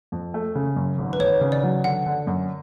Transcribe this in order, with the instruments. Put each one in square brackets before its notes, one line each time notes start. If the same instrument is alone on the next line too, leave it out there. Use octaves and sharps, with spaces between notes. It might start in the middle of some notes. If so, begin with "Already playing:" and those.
[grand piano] F2
A3
C#3
F#2
G#1
[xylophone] B4
[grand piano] G#1 [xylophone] C#5
[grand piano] C#3
[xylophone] D5
[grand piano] F#3
[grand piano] D3 [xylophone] F#5
[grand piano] D3
F#2